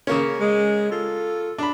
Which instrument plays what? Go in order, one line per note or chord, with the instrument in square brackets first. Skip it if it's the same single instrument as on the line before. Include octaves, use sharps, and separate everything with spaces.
[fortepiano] C#3 A#3 C#4
[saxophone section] G#3
F4 A4
[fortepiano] D4 B5